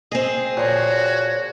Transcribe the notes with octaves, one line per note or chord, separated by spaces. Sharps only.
C4 G#4 D#5
A#2 F3 F#4 C#5